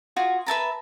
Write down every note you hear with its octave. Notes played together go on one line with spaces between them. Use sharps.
F4 F#4 G#4
B4 E5 A5 A#5